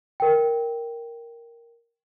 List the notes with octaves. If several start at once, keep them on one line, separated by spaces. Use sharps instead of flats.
A#4 G5